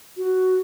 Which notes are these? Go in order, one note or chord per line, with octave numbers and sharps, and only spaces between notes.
F#4